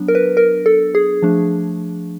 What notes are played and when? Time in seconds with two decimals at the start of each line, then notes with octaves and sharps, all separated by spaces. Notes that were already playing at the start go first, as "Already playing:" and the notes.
Already playing: F#3 B3 D4
0.08 A#4
0.15 B4
0.37 A#4
0.66 A4
0.95 G#4
1.22 F3 A3 D4